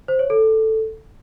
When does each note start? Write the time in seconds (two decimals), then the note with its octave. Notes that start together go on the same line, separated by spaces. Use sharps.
0.08 C5
0.19 C#5
0.30 A4